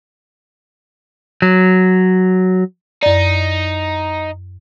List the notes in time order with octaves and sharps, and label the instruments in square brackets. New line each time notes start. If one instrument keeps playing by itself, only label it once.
[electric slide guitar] F#3
[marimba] F#2 D5 [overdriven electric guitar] D#4